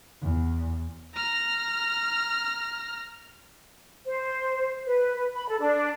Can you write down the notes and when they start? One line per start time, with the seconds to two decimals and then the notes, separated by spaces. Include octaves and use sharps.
0.22 E2
1.14 A#5 F6
4.06 C5
4.86 B4
5.16 B4
5.34 B5
5.49 A4
5.60 D4